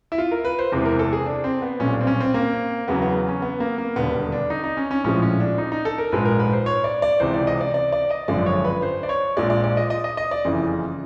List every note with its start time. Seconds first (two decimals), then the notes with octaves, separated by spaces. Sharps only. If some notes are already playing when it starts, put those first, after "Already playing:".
0.12 E4
0.18 F4
0.31 A#4
0.45 B4
0.59 C5
0.72 E2 C3 E3 G#3
0.86 A#4
0.99 A4
1.13 G#4
1.26 D4
1.44 C4
1.62 B3
1.80 B1 A#2 G3 C#4
1.93 D4
2.01 C4
2.07 C#4
2.20 C4
2.34 A#3
2.88 E2 C#3 F#3 B3
3.02 B3
3.28 C#4
3.42 B3
3.60 A#3
3.78 A#3
3.96 E1 D#2 D3 G3 B3
4.32 D4
4.50 D#4
4.64 D#4
4.77 C#4
4.91 C#4
5.04 A#1 A2 F3 G#3 C#4
5.22 C#4
5.40 D4
5.58 D#4
5.72 D#4
5.85 A4
5.98 A#4
6.12 A#1 G#2 F3 G#3 B4
6.25 A#4
6.39 B4
6.53 C5
6.66 C#5
6.84 D5
7.02 D5
7.20 C#2 C3 E3 C5
7.34 D5
7.47 D#5
7.61 D5
7.74 D5
7.92 D5
8.11 D#5
8.28 G#1 F#2 D3 F3 G#3 D5
8.46 C#5
8.65 B4
8.83 C5
9.03 D5
9.09 C#5
9.37 A#1 A#2 F3 G#3 D5
9.50 D5
9.64 D5
9.77 D#5
9.90 D#5
10.04 D#5
10.17 D#5
10.31 D5
10.45 F#1 F2 C#3 E3